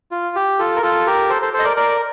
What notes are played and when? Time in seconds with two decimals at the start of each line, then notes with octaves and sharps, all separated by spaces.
0.11 F4
0.36 G4
0.59 F4 A4
0.76 A#4
0.82 F4 A4
1.06 G4 A#4
1.29 A4 C5
1.42 A4 C5
1.53 A4 C5
1.59 D#5
1.64 A#4 D5
1.77 A#4 D5